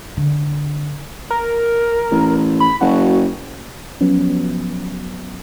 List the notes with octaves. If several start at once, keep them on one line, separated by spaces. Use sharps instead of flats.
D3
A#4
A1
B5
F#1 F#4
F3 F#3 B3 C#4